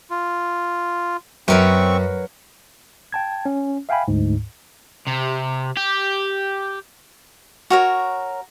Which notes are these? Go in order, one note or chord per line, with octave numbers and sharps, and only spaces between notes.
F4
F#2 F#3 C4 A#4 B4 C#6
G5 A5 G#6
C#4
E5 F5 G5 G#5 B5
D2 G#2
C3
G4
F#4 A#4 C#5